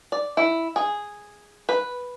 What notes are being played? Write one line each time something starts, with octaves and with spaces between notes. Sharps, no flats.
D5
E4
G#4
B4